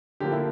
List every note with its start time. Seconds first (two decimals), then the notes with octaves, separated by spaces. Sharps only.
0.20 D3 F3 A#3 G4
0.32 E4